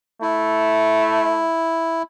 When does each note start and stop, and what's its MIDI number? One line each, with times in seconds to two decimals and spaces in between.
0.22 1.51 57
0.22 2.03 64